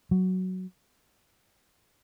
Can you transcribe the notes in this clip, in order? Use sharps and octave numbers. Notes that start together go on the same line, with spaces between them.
F#3